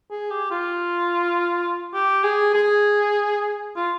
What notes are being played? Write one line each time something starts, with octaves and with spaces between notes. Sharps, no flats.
G#4
G4
F4
G4
G#4
G#4
F4